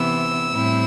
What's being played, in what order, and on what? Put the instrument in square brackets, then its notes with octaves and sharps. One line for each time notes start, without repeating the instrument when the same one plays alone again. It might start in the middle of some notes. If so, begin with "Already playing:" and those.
Already playing: [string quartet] C3 E3 B3 E4 E6
A2 G3 C4 E4